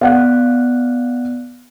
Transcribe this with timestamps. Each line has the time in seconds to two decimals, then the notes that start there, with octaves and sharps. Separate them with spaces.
0.01 B3 D5 F5 F#5 F#6